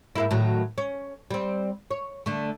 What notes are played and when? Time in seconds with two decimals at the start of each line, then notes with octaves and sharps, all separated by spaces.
0.15 G#2 A#3 E4
0.31 A2 D#3 F#3
0.78 C#4
1.31 G3 C4
1.91 C#5
2.26 D3 A3